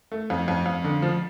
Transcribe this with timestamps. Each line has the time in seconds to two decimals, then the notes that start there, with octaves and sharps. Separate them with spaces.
0.12 A3
0.30 F2
0.48 F2
0.66 F2
0.84 D3
1.02 F3